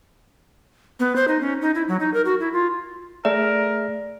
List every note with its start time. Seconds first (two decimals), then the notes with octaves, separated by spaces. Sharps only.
1.00 B3
1.16 C5
1.28 D#4
1.41 C#4
1.62 D#4
1.75 E4
1.88 F#3
2.00 D#4
2.14 A#4
2.25 F#4
2.40 E4
2.53 F4
3.25 A3 G#4 A#4 D5 E5